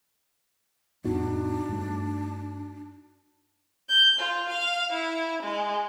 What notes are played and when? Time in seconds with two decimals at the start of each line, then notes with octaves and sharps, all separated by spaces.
1.05 F2 A2 B3 D4 D#4 F#4
1.69 G2 A3
3.88 G6
4.19 F4
4.49 F5
4.93 E4
5.42 G#3